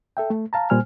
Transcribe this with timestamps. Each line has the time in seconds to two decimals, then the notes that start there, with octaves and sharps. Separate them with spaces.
0.17 A4 E5 G5
0.30 A3
0.53 F5 A5 A#5
0.70 A#2 G3 C5 G#5 F6